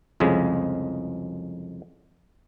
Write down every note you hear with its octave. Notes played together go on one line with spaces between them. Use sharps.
C2 F2 C#3 G#3